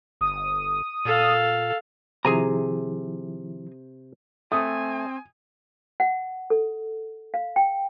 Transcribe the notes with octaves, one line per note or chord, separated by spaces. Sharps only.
G1 D#6
A#2 A4 F5
C3 D#3 F3 E4 G#4 G#5 A#5
A3 C4 G#5 D#6
F#5
A4
F5
G5